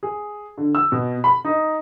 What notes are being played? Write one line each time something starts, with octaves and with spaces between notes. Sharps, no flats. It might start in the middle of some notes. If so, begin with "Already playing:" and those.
G#4
D3
E6
B2
B5
D#4